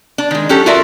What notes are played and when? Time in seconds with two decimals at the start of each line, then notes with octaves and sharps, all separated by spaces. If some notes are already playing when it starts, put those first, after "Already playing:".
0.18 D4
0.31 D#3 G#3
0.49 F#3 C#4 G4 A4
0.66 F4 F#4 A4 A#4 D5 E5